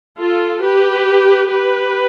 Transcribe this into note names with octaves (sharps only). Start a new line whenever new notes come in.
F4 A4
G4 B4
G4 B4